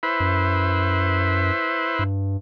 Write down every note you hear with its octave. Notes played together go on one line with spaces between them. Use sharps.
E4 B4 C5
F#2
G2